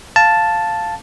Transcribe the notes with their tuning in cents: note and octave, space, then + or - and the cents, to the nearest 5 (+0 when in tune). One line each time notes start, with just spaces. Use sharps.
F5 +0 A5 +0